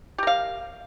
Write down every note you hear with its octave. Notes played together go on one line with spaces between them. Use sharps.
G4 A#4 F5